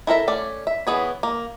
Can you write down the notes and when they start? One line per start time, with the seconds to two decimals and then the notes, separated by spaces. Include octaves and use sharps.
0.07 E4 A4 A#4 E5
0.28 A3 C#4 D5
0.67 E5
0.87 E3 B3 G#4 C#5
1.23 A#3